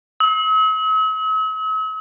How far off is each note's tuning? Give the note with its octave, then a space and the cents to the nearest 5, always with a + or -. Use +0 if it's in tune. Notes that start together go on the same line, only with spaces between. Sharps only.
E6 -45